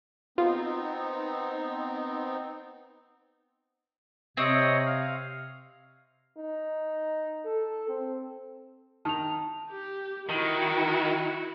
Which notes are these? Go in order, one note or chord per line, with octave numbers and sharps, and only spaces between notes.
B3 C4 D#4 F4
C3 C4 C#5 D#5
F5
D#4
A4
C4
D#3 A5 F7
G4
D#3 E4 F#4